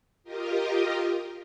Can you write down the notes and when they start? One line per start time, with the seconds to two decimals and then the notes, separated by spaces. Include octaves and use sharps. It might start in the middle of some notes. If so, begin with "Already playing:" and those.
0.24 F4 G4 A#4 D#5